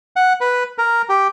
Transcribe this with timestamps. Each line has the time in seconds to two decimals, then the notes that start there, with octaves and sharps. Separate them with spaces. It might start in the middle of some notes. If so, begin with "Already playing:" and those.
0.16 F#5
0.41 B4
0.78 A#4
1.09 G4